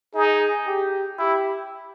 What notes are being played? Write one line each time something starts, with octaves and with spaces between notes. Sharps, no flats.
D#4 G#4
G4
E4 G4